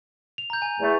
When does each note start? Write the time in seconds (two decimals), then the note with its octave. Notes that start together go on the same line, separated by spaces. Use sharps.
0.38 F7
0.50 A#5 G6
0.62 G#5
0.80 E2 A3